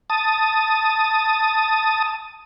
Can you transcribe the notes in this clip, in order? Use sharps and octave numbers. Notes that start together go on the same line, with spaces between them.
A5 D#6